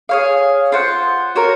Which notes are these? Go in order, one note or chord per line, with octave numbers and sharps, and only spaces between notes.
G#4 C#5 F5
F4 C5 F#5
F#4 A#4 C#5